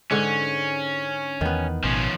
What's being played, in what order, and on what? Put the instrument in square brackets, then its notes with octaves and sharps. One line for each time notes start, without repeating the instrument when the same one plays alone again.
[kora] G#2 D3 [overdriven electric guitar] C#4
[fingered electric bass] E2 [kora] D#3 B3
[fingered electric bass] A1 B2 [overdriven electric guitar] F3 C#4